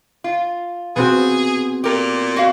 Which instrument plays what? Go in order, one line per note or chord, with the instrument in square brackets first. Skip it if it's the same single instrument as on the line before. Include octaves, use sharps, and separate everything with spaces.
[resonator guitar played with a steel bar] F4
[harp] B3 C4 F#4 [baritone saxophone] G#4
[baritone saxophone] A#2 [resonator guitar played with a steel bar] G4 A#4
[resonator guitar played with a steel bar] F#4 F5